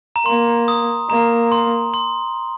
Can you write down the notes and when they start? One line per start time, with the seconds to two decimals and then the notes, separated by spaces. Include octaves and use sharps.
0.16 A#5
0.26 A#3 C6
0.68 D#6
1.10 A#3 A#5
1.52 C6
1.94 C6